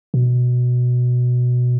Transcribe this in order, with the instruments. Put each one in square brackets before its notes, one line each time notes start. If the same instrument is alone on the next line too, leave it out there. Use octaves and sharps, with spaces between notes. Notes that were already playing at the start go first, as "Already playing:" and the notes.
[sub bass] B2